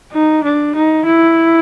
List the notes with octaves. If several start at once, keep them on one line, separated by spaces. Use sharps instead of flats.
D#4
D4
D#4
E4